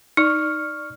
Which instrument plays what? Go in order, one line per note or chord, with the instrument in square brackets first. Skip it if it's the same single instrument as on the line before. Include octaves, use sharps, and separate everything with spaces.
[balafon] D#4 [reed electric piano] D5 C#6 F6